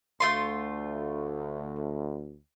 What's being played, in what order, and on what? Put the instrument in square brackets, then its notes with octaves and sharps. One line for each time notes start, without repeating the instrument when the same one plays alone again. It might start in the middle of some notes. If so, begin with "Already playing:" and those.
[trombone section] D2 [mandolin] A3 F4 C6